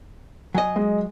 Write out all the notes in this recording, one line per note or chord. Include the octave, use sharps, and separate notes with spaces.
F#3 D#5 G#5
G#3